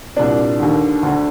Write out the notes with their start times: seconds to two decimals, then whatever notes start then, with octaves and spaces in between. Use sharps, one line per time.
0.16 C2 A#2 D4
0.60 D#2 D3
1.03 D2 D3